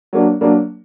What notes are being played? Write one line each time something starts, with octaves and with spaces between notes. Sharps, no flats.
F#3 A#3 D4
F#3 A#3 D4